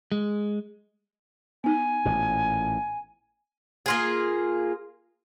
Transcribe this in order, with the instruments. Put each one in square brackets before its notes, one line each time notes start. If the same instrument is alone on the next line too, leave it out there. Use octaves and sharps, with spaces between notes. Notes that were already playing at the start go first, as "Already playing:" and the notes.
[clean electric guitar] G#3
[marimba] B3 D#4 [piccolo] G#5
[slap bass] A1 A#2
[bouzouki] A#3 F4 G#4